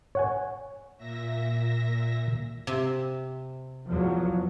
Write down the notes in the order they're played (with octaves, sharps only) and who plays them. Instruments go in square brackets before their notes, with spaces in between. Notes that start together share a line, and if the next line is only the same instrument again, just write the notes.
[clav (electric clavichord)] C#5 F#5 G#5
[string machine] A#2 E5 A#6
[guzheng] C3
[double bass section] E2 F3 F#3